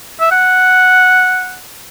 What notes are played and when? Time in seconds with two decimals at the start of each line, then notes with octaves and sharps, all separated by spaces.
0.20 E5
0.31 F#5